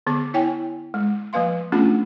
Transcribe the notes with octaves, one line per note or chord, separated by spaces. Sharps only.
D3 B3 G#4 D6
E4 C#5 G5 G#5
G#3
F3 A#3 B4 F5 C6
A3 B3 C#4 D4 F4 G#4